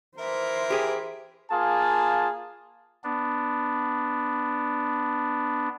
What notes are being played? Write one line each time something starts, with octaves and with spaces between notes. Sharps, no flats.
E3 A#4 C5 E5
G4 G#4
A#3 F4 G#4 A5
B3 D4